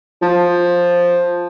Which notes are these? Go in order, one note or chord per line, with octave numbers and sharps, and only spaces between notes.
F3